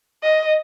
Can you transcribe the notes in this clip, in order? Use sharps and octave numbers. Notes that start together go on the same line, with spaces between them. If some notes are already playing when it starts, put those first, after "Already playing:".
D#5